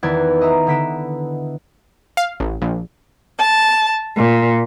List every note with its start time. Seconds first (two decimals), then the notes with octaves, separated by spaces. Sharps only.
0.03 E2 D#3 B4 D5 G#6 E7
0.41 D#5 E5 A#5
0.67 D3 B3 B6 D7 E7
2.17 F5
2.40 A1
2.62 A#1
3.39 A5
4.17 A#2